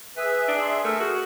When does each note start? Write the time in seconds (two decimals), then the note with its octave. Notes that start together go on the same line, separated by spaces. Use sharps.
0.17 G#4 B4 E5
0.48 D4
0.62 C6
0.85 A3 A#4
1.00 F#4 G#4